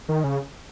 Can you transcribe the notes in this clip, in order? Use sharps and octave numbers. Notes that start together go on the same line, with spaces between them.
D#3
C#3